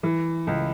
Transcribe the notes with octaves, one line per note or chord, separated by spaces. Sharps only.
E3
C#2